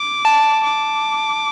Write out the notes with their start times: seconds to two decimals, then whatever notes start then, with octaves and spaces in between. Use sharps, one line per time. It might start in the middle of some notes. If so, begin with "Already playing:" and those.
Already playing: D6
0.25 A5
0.64 D6